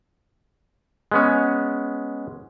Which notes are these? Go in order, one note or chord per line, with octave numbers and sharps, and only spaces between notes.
G#3 B3 C#4